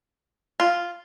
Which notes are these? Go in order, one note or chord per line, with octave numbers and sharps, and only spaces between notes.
F4